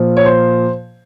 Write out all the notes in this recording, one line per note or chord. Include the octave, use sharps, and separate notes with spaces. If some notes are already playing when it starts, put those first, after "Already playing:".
Already playing: A#2 F3
C#5
C5